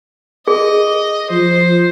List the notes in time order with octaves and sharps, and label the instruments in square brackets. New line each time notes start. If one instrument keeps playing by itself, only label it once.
[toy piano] G#4 [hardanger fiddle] D#5
[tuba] F3 [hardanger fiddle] C5